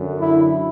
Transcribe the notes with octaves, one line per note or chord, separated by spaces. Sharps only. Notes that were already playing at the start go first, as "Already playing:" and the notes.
Already playing: F#2 D3
E4